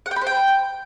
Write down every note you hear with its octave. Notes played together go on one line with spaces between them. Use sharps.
F#5
G5
B5
C5
G5